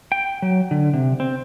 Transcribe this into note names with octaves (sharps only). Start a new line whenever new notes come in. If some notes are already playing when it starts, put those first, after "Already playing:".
G5
F#3
D3
C3
C4